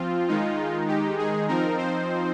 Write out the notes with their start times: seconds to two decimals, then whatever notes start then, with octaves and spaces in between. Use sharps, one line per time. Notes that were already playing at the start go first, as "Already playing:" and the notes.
Already playing: F3 C4 F4
0.28 D#3 G#3 D#4
0.88 G4
1.18 G#4
1.48 F3 C4 D#4 A#4
1.78 C5